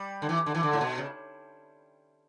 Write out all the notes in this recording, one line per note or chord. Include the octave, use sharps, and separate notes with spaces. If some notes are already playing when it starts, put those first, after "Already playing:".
Already playing: G3
D3
E3
D3
E3
D3
A2
B2
C#3